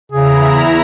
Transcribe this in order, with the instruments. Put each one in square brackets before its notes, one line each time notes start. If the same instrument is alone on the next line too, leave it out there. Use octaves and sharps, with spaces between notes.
[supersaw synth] E2 E4 A#5 [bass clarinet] C#3 [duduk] G#4